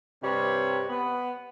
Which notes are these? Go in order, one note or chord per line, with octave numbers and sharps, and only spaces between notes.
G2 C3 G3 B4 C#5
B3